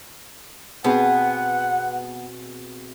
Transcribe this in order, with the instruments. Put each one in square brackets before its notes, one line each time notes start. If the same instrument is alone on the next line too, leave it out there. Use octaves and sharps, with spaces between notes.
[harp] B2 C4 G#4 [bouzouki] B3 [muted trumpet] F#5